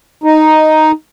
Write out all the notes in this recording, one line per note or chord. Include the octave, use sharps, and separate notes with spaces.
D#4